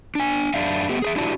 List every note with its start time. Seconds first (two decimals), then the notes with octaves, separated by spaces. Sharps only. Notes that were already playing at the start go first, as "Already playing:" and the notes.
0.15 D4 G#5
0.54 F#2 D4 E5 F5
0.89 A3 B3 G4
1.02 G#4 B4 E5
1.16 D4 E4 F#4 G4 D5 A5